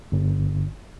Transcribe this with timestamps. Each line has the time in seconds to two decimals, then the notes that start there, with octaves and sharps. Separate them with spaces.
0.12 G1